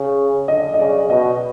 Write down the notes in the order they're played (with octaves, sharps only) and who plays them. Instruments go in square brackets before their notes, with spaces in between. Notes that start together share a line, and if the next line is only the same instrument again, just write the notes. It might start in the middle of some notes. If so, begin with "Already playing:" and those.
Already playing: [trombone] C#3
[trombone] D3 [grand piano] D#5
[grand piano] D#5
[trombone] C#3 [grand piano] D5
[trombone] B2 [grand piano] D#5